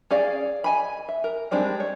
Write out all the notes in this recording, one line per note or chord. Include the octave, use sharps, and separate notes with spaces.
C#4 G#4 D5 F5
D#5 G#5 B5
E5
A#4
G3 G#3 C4 D4 D#4
C#5